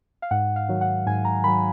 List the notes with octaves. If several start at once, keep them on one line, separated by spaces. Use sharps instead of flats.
F5
G#2 F#5
F5
D#3 F#3
F#5
G#2 G#5
A#5
D#3 F#3 B5